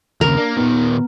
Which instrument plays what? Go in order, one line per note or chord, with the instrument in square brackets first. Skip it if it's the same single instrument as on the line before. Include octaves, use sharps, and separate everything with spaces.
[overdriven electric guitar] D#2 C#3 [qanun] A#4
[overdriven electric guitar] A#3 [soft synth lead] D4
[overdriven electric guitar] A#2 D#3 [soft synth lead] B3